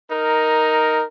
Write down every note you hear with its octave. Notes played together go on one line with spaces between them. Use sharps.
D#4 A#4